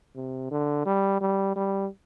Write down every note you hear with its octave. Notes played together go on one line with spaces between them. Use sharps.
C3
D3
G3
G3
G3